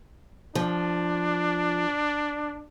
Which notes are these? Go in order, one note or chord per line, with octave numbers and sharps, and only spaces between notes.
F3 D4